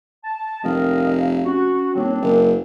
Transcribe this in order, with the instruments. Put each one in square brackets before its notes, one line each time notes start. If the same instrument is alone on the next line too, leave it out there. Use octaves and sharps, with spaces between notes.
[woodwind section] A5
[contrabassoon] F1 [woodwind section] D#3 A#4 D#5 [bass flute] F5
[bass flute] C#4 [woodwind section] F#4
[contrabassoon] D#1 [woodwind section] C4 D4 [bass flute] C#5
[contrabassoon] F#1 [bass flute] A#4